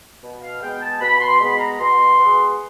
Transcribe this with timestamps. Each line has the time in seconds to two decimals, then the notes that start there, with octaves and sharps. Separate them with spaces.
0.22 B2
0.42 F5
0.61 G#3 B3 G5
0.82 A5
1.01 B2 B5
1.20 C6
1.40 G#3 B3 B5
1.60 A#5
1.80 B2 C6
2.19 G#3 B3